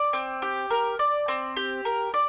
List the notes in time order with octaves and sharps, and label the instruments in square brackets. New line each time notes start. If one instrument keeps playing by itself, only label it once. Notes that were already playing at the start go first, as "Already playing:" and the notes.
Already playing: [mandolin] D5
C4
G4
A#4
D5
C4
G4
A#4
D5